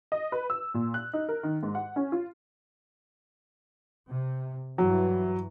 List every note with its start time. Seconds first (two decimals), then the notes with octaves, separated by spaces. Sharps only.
0.12 D#5
0.32 B4
0.50 E6
0.74 A#2
0.94 F#6
1.13 D#4
1.29 A#4
1.43 D#3
1.63 G#2
1.75 F#5
1.96 C#4
2.12 F4
4.10 C3
4.78 G2 E3 F#3